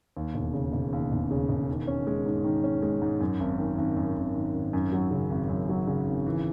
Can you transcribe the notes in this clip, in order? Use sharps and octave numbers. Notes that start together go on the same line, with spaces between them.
D#2
E1
C#3
E1
D#2
E1
C#3
E1
D#3
C#4
G#3
G#2
D#3
C#4
G#3
G#2
F#2
G#1
D#3
G#1
F#2
G#1
D#3
G#1
F#2
F#3
C#3
G#1
F#2
F#3
C#3
G#1
E3